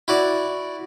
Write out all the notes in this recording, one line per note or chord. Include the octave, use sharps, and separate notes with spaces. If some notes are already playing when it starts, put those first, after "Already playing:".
E4 F#4 D5